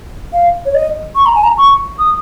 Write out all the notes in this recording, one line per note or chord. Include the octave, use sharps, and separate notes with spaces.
F5
C#5
D#5
C#6
A#5
G#5
A#5
C#6
D#6